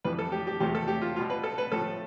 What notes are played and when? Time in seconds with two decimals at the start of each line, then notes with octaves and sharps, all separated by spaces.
0.04 F2 E3 G3 B4
0.19 A4
0.32 G4
0.47 G4
0.60 E2 C3 F3 A3 G4
0.75 A4
0.88 G4
1.02 F4
1.16 B2 G3 F4
1.30 B4
1.44 A4
1.58 B4
1.72 A2 F3 A3 A4